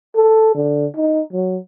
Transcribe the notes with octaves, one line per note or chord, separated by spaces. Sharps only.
A4
D3
D#4
F#3